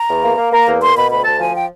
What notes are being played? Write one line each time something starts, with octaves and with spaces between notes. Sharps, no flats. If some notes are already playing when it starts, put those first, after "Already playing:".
Already playing: A#5
E2
A#3
A#3
A#3 A#5
E2
A#3 C6
B2 B5
D2 B5
D2 A5
F3 G#5
G5